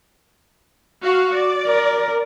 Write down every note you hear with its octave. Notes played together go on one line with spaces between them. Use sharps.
F#4 F5
D5
A#4